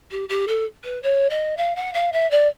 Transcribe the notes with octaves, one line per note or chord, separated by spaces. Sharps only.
G4
G4
A4
B4
C#5
D#5
F5
F#5
F5
E5
D5